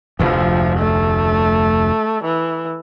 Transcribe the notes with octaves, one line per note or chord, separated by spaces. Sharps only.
F1 D2 F3
A3
E3